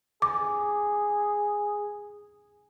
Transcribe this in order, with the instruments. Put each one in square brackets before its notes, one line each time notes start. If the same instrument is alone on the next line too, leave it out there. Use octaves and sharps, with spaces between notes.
[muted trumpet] G#4 [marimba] D6